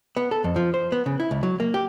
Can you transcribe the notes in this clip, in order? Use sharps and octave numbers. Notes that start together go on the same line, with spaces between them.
B3
A4
F2
F3
C5
B3
C#3
E4
C#2
F#3
A#3
G4